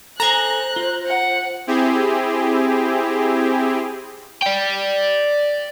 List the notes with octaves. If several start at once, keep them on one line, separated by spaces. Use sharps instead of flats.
A4 C5 G#5 A#5 F#6
F4
F#5
C4 E4 G4 G#4
D5 G5